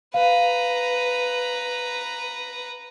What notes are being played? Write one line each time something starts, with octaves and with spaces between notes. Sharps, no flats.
B4 F5 A#5